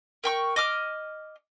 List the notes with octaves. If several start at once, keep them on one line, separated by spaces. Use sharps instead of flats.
A#4 G5 C#6
D#5 D6 F6